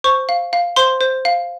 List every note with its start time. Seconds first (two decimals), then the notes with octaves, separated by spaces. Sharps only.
0.04 C5 C#6
0.29 F5
0.53 F5
0.76 C5 C6
1.01 C5
1.25 F5